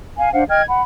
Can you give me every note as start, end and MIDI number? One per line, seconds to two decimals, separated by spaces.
0.17 0.31 77
0.17 0.31 80
0.33 0.44 62
0.33 0.44 72
0.33 0.44 77
0.33 0.44 78
0.49 0.62 75
0.49 0.62 79
0.49 0.62 89
0.49 0.62 92
0.67 0.82 78
0.67 0.82 83